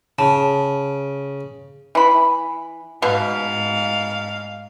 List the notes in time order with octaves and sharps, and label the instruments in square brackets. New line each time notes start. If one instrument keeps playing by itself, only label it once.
[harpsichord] C#3 [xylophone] A5
[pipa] E3 B5
[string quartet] G#2 [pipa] B2 [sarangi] F5